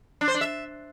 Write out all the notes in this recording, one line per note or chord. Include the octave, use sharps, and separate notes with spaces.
D4
C5
D4
E5